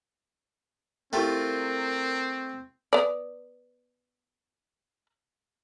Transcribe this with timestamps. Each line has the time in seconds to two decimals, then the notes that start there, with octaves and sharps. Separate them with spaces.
1.13 A3 C4 E4 F4 G4 A#4 G5
2.93 B3 D5